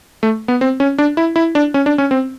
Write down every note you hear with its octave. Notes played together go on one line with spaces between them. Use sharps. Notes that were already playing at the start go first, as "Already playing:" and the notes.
A3
B3
C4
C#4
D4
E4
E4
D4
C#4
D4
C#4
C4